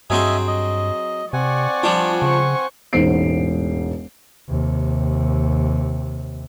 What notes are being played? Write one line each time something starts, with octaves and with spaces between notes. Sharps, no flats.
G2 F#3 C4 G#4 D#5 E5 G#5
D#5
C3 C4 D5 F#5 G#5 C#6
F3 G3 D4 F4
C#3 C5 C#6
E1 A1 G#2 C5 C7 D7
D#2 C3